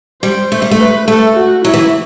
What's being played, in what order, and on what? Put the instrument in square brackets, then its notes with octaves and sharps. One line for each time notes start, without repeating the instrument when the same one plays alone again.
[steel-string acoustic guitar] G3 [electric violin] C5
[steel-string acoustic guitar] A3
G3
A3
[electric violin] B4
[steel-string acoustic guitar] A3 [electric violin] A4
[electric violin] F#4
[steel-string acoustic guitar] F#3 [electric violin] E4
[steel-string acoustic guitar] E3